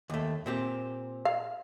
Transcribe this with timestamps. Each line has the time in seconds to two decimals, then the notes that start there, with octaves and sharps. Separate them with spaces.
0.10 D#2 A3
0.46 A#2 C4 G4
1.25 F5